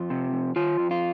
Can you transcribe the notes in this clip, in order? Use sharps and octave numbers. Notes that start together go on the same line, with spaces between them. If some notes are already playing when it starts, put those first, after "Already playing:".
Already playing: F2 F4
C3
F2
D#3 F4
F2
F4